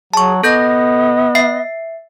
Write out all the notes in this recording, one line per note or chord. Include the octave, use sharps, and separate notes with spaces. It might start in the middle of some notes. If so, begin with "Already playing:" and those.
F#3 G#4 A5 C#6
B3 A4 D#5 G6 A#6
E5 C7